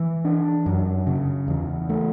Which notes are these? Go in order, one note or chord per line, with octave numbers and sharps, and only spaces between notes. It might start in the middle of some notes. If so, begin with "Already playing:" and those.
Already playing: E3
D4
F#2
C#3
E2
A3